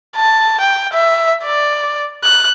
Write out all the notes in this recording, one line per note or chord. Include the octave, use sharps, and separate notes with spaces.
A5
G5
E5
D5
F#6